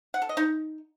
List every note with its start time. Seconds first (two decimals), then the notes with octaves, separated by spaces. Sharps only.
0.14 F#5
0.22 A4
0.29 D#5
0.37 D#4